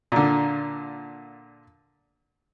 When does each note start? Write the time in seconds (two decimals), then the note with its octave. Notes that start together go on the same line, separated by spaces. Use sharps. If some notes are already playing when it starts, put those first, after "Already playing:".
0.12 A#2 D3